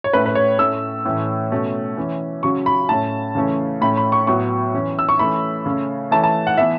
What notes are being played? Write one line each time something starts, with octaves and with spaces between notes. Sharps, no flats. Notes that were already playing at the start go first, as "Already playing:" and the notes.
C#5
A2 A3 C#4 B4
B4
C#5
A2 A3 C#4 E6
A2 E3 A3 C#4
B2 A3 C#4
E3 C#4
C#3 F#3 C#4 C#6
B5
A2 A3 C#4 A5
C#3 E3 A3 C#4
A2 A3 C#4 B5
B5
C#6
A2 F#3 B3 C#6
E3 C#4
E6
C#6
E3 A3 C#4 B5
C#3 A3 C#4
E3 A3 C#4 A5
A5
F#5
E3 B3 E5